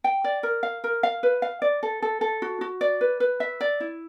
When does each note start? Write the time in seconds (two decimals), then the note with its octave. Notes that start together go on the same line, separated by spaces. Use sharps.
0.04 G5
0.24 D5
0.43 A#4
0.63 F5
0.84 A#4
1.03 F5
1.23 B4
1.42 F5
1.62 D5
1.83 A4
2.02 A4
2.21 A4
2.42 F#4
2.61 F#4
2.81 D5
3.01 B4
3.20 B4
3.40 E5
3.61 D5
3.80 E4